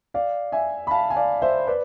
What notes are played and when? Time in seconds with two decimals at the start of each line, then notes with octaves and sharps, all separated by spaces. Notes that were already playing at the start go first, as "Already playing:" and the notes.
0.14 D5 F5
0.52 E5 G#5
0.87 B5
0.91 F5 A5
1.10 G#5
1.16 D5 F5
1.42 C5 E5
1.67 B4 D5